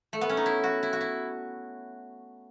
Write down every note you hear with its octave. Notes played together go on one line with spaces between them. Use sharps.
A3
B3
C#4
D#4
E4
F#4
E4
F#4
E4